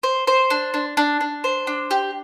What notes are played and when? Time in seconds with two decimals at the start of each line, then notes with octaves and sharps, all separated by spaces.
0.03 C5
0.27 C5
0.50 D4
0.74 D4
0.97 D4
1.21 D4
1.44 C5
1.67 D4
1.91 G4